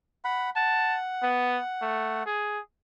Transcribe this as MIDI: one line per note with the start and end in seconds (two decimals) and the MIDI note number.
0.25 0.50 78
0.25 0.50 83
0.56 2.23 78
0.56 0.98 81
1.22 1.59 59
1.82 2.26 57
2.26 2.59 68